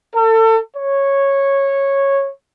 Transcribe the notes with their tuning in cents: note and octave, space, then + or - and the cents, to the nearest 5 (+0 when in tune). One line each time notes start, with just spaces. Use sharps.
A4 +30
C#5 -10